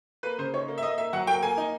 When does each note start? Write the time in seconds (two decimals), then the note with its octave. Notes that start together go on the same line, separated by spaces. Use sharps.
0.23 A#3 B4
0.38 C#3 C5
0.54 D#4 C#5
0.68 A#3
0.78 E5
0.83 A#3 D#5
0.98 A#3 E5
1.13 F#3 F#5
1.27 A#3 G5
1.42 A#3 G#5
1.58 D#4